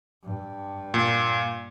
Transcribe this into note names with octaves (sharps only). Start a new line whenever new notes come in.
G2
A#2